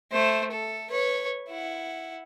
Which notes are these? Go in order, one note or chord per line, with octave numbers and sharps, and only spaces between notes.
A3 C5
A4
B4 C#5
E4 F#5